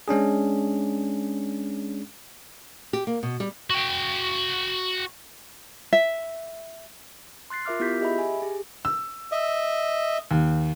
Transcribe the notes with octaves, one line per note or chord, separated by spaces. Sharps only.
G#3 C#4 D4 G#4
G4
A#3
B2
G3
F#4 G5
E5
C6 F#6 A6 C7
F4 A#4 E5 D6 F6
B3 E4 F4 G4 G6 B6
G4 G#4 D#5 E5 B5
G#5
G4 G#4
E6
D#5 E5
D#2